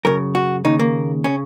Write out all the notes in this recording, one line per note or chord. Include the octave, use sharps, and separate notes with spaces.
F#2 C#3 A#4
F#4
D#2 C#3 D#4
A#3
C#3 C#4